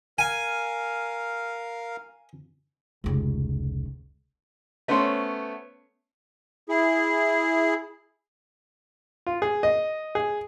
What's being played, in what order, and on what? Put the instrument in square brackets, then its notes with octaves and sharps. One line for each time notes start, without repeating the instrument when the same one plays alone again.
[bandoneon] A#4 F5 [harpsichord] G#5
[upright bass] F1 C#2
[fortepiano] A3 B3 C#4 C5 C#5
[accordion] E4 G#4
[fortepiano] F4
G#4
D#5
G#4